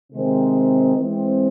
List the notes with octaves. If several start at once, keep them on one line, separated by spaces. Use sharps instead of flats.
C3 D#3 G#3 C4
E3 G#3 C4